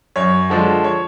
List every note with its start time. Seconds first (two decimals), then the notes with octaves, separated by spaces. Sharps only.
0.16 F#2 C#5
0.50 D3 F3 G#3
0.84 C#5